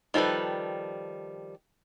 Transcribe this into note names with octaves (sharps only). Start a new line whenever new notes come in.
D#3 F3 G3 A4 B4